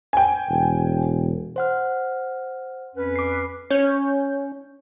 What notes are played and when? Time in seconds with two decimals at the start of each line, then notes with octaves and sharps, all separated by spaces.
0.13 G5 G#5
0.49 E1
1.56 C5 F#5 F6
2.95 F2 C#4 B4
3.16 D6 C7
3.70 C#4 C#5 G6